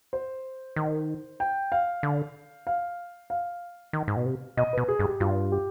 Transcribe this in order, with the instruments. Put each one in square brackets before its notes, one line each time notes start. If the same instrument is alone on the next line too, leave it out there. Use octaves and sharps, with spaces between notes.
[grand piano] C5
[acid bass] D#3
[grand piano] G5
F5
[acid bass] D3
[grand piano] F5
F5
[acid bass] D#3
G#2
B2
C3
[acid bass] B2 [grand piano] D#5
[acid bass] B2 [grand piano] B4
[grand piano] G#4
[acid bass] G2
[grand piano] G4
[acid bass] G2 [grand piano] F4
[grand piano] G4